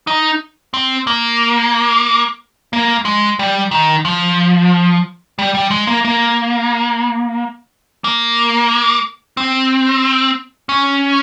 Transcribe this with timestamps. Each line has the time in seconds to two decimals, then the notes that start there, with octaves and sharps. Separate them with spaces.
0.07 D#4
0.74 C4
1.07 A#3
2.73 A#3
3.05 G#3
3.39 G3
3.71 D#3
4.05 F3
5.39 G3
5.54 G3
5.71 G#3
5.87 A#3
6.05 A#3
8.04 A#3
9.37 C4
10.69 C#4